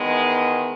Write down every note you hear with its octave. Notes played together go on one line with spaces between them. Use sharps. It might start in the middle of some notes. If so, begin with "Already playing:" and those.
Already playing: E2 D#3 G#3 B3